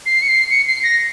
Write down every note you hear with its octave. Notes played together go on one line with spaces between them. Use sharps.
C7
C#7
C7
C#7
C7
A#6